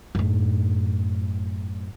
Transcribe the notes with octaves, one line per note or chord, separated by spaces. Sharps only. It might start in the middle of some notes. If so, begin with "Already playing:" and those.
F#2 A2